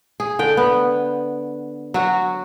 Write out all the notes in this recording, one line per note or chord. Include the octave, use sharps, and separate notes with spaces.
G#4
D3 G5
B3
F#3 F#4